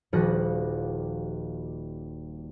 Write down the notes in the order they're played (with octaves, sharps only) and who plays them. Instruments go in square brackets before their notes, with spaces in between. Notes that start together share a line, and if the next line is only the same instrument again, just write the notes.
[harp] D#1 F3 G3 F#4 D#5 F#6